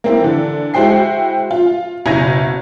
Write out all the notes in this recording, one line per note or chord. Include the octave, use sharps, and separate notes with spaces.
A#3 C4 E4
D3 E3
G#3 E4 F#4 C5 G5 C7
F4
F#1 B2 E4 G#6 A#6 D#7